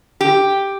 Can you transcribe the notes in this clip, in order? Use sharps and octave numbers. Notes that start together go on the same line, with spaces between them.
G4